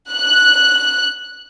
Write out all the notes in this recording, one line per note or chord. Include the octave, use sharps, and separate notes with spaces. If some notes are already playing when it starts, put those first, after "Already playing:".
F#6